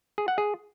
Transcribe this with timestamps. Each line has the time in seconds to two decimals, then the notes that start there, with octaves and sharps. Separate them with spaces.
0.18 G#4
0.28 F#5
0.38 G#4